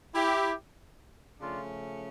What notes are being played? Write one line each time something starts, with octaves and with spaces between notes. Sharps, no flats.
E4 G4
C#3 F3 A3 C#4 D4 F4